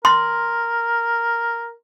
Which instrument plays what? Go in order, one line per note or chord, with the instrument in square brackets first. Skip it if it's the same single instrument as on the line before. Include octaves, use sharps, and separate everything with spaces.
[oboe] A#4 [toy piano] C6